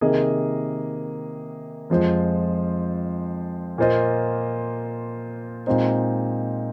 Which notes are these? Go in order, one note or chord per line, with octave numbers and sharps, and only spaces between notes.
C3 D#3 A#3 G#4 D#5
F2 F3 G#3 F4 C5
A#2 A#3 F4 C5 D#5
A#2 G#3 C4 D#4 C5